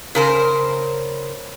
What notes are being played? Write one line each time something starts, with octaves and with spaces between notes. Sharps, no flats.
C#3 A#4 C5